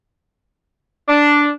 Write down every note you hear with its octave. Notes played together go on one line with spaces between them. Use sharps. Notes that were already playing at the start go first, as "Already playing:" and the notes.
D4